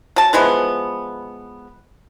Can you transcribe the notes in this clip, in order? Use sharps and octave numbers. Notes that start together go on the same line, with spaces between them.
F#3 A5
E3 F3 G#3 B3